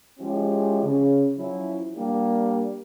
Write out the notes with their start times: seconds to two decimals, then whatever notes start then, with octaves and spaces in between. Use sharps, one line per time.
0.19 F3 G#3 C#4 E4 G4
0.82 C#3
1.37 F3 F#3 C#4 E4
1.96 G3 A#3 D4 G4